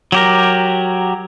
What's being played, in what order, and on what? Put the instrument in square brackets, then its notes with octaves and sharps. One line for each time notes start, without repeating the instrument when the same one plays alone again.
[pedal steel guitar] F#3 G4 A#4